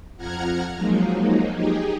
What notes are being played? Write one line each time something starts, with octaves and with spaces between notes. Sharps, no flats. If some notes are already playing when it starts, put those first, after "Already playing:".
F2 F3 F#5 A#5 F6 G#6
F3 F#3 G#3 A#3 D#4
D#4 G4 G#4